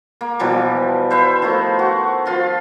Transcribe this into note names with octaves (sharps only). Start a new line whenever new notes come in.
A#3
B2 E3 F3 G3
B4 C5 E5
D#3 F3 A3
F#4
F3 F4 C6